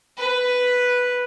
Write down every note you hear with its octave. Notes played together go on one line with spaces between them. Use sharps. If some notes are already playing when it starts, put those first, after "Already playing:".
B4